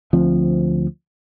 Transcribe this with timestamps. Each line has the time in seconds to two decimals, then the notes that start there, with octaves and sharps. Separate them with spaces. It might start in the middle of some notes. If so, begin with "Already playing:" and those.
0.13 D2 F3 C4